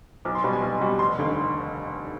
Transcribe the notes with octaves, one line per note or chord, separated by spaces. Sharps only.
B1 D6
C6
B2 G3 B5
G#5
B1
B2 G3
F1 C6
D#2 D3